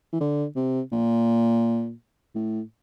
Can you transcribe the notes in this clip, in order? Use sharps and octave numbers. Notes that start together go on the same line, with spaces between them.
E3
D3
C3
A#2
A2